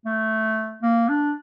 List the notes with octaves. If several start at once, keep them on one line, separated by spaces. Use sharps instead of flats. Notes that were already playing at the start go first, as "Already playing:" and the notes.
A3
A#3
D4